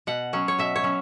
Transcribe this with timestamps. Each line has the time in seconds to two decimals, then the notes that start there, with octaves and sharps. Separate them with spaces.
0.07 B2 F#5
0.33 F#3 C#4
0.48 C#5
0.59 B2 E5
0.76 C#5
0.83 F#3 C#4